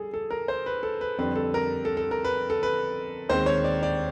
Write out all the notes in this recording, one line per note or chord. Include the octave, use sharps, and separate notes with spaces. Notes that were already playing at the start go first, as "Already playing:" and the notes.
Already playing: G3 G#4 A4
A4
A#4
C5
B4
A4
B4
F2 D3 G3 C4 B4
A4
A#4
A4
A4
A#4
B4
A4
B4
D#2 D#3 G#3 C4 C5
C#5
D5
D5